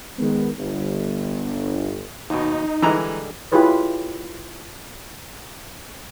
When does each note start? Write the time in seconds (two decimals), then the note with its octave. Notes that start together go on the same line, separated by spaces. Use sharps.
0.19 D#3 G#3 B3
0.58 G1
2.30 D#2 B2 D#4
2.82 D3 E3 G3 G#3 A#5
3.52 E4 F4 G4 G#4 B4 C#5